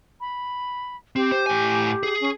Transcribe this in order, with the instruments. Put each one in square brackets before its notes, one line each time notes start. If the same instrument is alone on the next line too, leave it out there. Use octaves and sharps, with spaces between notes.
[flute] B5
[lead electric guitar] C4 [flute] G4
[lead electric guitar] C5
A2 G#5
G#4
[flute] C#4